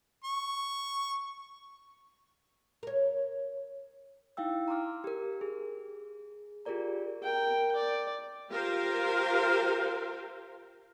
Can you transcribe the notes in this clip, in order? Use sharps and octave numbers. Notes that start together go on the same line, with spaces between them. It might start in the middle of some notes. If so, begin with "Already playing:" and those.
C#6
A#4 C#5
D#4 E4 F5 G5 E6
A#5 C6 D6 F6
G4 A#4
G#4
F4 G4 G#4 A#4 D5 A#5
A#4 G5
D5
F4 G4 A#4 C5 F5